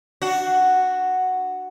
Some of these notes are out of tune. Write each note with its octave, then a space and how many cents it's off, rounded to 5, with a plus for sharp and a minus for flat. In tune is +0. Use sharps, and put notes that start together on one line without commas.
D4 +20 F#4 +0